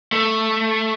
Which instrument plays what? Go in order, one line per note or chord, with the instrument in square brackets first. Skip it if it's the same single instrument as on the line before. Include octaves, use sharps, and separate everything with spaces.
[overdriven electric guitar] A3